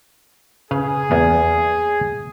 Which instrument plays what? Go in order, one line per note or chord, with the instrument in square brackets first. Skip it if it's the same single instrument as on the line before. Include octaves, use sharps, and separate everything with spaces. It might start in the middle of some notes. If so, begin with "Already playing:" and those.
[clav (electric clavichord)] C#3 B4 F5 [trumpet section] G#4
[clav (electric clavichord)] E2 A#3 B3